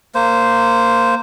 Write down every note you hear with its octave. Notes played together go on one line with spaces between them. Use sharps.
A#3 C5